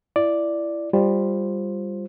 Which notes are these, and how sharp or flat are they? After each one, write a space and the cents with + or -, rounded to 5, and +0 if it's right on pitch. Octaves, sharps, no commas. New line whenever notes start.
E4 +25 D5 +0
G3 +15 F4 +0 C5 +10